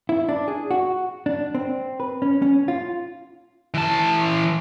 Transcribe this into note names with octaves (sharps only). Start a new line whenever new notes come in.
E4
D4
G#4
F#4
D4
C4
B4
C#4
C#4
F4
E3 A5